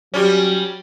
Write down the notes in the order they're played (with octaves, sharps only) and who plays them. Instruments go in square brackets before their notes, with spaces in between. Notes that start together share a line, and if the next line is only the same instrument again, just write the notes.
[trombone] F#3 [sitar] G3 C#4